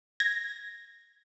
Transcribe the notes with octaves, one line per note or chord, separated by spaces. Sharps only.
G#6 A#6